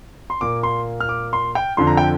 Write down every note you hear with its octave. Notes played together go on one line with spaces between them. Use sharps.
C6
A#2 A#3 D6
C6
F6
D6
C6
G5
F2 D3 F3 C6
A#5
G5